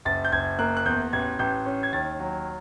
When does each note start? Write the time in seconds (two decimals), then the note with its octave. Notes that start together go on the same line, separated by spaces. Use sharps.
0.05 F#1 A6
0.25 G6
0.32 F#1 G#6
0.59 A#3 F#6
0.77 F#6
0.86 E2 G6
1.13 A1 G#6
1.39 A1 G6
1.66 C#4
1.83 G#6
1.93 D#2 A6
2.19 F#3